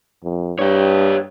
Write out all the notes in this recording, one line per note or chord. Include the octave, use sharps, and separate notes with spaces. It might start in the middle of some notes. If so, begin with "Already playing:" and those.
F2
G2 G4 C#5